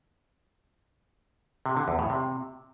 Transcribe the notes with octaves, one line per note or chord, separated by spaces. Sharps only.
C3
D3
E2
A2
C3